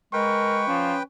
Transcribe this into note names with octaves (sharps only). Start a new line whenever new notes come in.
G#3 A#4 B4 G5 C#6
F3 C#4